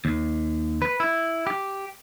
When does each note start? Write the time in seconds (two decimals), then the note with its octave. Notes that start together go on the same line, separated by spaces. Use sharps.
0.05 D#2
0.82 B4
1.00 E4
1.47 G4